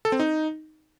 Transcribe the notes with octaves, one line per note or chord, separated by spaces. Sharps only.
A4
C4
D#4